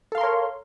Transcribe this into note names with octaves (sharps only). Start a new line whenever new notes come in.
A4 A#4 C#5 F5 C6